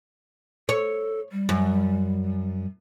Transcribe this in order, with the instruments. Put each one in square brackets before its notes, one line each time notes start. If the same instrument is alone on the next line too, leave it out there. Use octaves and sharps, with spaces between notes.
[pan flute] A4 [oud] C#5
[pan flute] G3
[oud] F#2